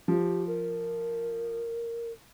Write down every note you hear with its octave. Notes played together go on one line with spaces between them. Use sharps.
F3 G4
A#4